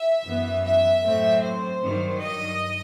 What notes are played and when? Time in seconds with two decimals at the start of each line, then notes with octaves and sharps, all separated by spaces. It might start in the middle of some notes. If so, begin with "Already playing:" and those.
Already playing: E5
0.24 F#2 E3 B3
0.63 E5
1.03 A2 F#3 A3 C4
1.42 C5
1.82 G2 D#3 F#3
2.21 D#5